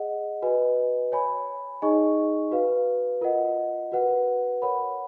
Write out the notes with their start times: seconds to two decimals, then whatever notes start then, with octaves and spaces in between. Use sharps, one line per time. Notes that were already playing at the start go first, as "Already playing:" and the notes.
Already playing: G#4 D#5 F#5
0.42 F#4 B4 D#5 G#5
1.12 C#5 G#5 B5
1.82 D#4 G#4 D#5 G#5 C#6
2.51 F#4 B4 F5
3.21 F4 A#4 D#5 F#5
3.92 F#4 B4 F#5
4.62 A#4 C#5 F#5 B5